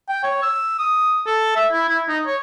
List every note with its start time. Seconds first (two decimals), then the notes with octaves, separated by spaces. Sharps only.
0.09 G5
0.24 C#5
0.43 E6
0.79 D#6
1.27 A4
1.56 E5
1.72 E4
1.89 E4
2.09 D#4
2.26 C#5